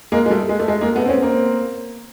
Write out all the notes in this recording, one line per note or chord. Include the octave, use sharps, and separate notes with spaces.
G#3 A#3
G#3
G3 A3
G#3
A3
G#3
G#3 A#3
A3 B3
C4
B3 C#4
A#3 C4